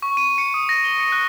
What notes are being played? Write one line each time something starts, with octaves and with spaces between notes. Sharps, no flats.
C#6
D#7
C#7
D#6
A#6
G7
C#7
F#6